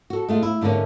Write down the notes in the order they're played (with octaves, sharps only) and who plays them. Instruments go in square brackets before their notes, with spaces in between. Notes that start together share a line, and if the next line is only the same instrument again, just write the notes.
[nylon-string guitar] F#4 A4
G#3 A3 F4
E4
G#2 D3 E3 A#3 C#4